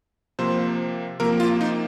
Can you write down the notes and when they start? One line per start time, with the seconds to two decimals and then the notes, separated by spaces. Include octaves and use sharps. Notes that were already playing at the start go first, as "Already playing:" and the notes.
0.39 C3 F3 A#3 C5
1.20 C3 F3 A#3 A#4
1.40 F4
1.61 D#4